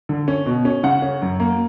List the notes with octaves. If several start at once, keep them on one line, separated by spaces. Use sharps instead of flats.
D3
C#4
B2
C#4
C#3 F#5
C#4
F#2
A#3